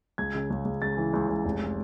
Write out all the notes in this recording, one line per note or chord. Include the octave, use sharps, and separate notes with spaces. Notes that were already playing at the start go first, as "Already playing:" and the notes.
C#2 G#6
C#3
C#2
C#2
C#2 A6
E3
C#2
C#2
F1